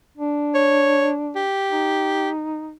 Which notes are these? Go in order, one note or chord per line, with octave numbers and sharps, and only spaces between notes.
D4
C#5
G4
D#4